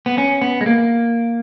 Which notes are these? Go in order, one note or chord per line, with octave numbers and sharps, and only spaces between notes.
B3
C#4
B3
G#3
A#3